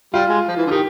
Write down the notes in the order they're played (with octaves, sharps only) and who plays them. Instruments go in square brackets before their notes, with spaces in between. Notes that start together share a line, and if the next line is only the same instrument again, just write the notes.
[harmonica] G3 [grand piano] F4
[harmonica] G#3
F3
E3
D3
[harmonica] D#3 [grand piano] G4